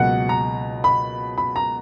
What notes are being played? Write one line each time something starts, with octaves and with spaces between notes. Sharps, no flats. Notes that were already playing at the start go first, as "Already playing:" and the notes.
Already playing: C#2 B2 F#3 A#3 F#5
A#5
B5
B5
A#5